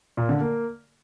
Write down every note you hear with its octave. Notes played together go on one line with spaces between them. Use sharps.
A#2
D3
A#3